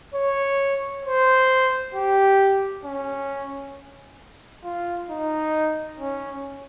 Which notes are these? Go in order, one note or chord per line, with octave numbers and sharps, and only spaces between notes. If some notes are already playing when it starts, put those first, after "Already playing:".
C#5
C5
G4
C#4
F4
D#4
C#4